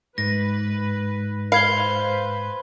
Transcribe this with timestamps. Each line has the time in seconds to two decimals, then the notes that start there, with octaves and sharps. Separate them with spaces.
0.18 G#2 B4 A#6
1.52 B4 C5 F5 B5 G#6 G7